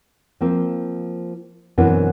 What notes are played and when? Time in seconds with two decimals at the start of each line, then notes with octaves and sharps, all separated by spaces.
0.41 F3 A#3 C4
1.78 F#2 B2 E3 B3 C4 D4